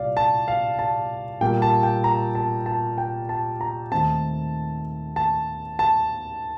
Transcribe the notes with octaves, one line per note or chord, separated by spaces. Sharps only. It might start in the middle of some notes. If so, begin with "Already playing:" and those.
Already playing: C2 A#2 G3 D5 F5
A5
F5
A5
A#2 G3 A#3 G5
A5
G5
A#5
A5
A5
G5
A5
A#5
D#2 D#3 A3 C4 A5
A5
A5